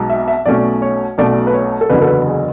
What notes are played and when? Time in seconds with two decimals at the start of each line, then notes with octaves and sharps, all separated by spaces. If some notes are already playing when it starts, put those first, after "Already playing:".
Already playing: B1 B2 G#3
0.10 E5
0.28 E5
0.46 B1 B2 A3 C#4 D5
0.82 C#5
1.18 B1 B2 A3 C#4 D5
1.47 B4
1.54 C#5
1.81 A4
1.89 F#1 E2 D3 F#3 B4
2.02 A4
2.07 B4
2.27 G#4